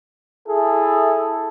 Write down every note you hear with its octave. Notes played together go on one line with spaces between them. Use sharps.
E4 G#4 A4